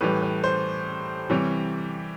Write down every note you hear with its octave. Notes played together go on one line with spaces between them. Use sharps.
A2 E3 G3 B4
B4
C5
C3 E3 G3 C#5